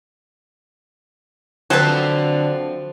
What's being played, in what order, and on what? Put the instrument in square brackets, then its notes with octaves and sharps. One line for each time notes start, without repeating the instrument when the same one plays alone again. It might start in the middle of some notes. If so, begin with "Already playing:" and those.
[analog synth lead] D3 [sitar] F3 C4 C5 [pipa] F#3 A4 B4